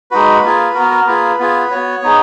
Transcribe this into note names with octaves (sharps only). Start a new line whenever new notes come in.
G#3 D#4 F#4 B4
A#3 F4 G#4
B3 F#4 A#4
A#4
A#3 F4 G#4 B4
B3 F4 G#4
B3 F#4 C#5
B3 D#4 G#4